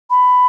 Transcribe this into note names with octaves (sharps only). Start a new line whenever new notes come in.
B5